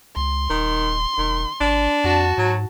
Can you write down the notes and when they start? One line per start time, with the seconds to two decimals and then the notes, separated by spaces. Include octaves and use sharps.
0.16 C#2 C6
0.50 D#1 D#3
1.18 E1 D#3
1.61 G#1 D4
2.04 F2 F#4 A5
2.38 G#2 F#3